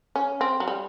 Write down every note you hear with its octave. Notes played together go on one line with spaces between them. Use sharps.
C#4
C4
F#3
G3